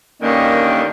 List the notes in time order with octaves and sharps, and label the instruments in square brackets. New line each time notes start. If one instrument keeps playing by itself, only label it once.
[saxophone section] G2 D3 D#3 [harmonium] A#3 C#4 D#5